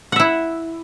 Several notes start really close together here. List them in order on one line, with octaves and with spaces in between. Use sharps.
F#5 E5 E4